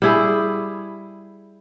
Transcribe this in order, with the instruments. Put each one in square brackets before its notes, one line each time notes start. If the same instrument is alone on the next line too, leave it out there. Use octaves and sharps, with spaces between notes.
[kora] G3 E4 G#4